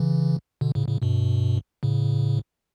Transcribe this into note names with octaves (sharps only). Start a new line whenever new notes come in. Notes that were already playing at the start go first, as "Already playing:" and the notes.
Already playing: C#3 E3
B2 D3
A2 C#3
A2 C#3
G2 B2
A2 C#3